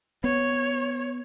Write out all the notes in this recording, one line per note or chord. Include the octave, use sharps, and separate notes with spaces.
B3 C#5